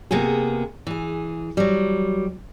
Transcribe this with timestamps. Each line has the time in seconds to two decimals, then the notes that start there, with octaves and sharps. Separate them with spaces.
0.11 C3 A#3 B3 G#4
0.87 E3 G#4
1.57 F#3 G3